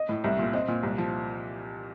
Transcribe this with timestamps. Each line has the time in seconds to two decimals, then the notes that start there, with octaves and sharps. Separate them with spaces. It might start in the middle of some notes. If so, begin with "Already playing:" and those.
Already playing: D#5
0.09 A2
0.24 C2 E5
0.39 A#2
0.53 C4 D#5
0.68 A#2
0.83 C2
0.98 F3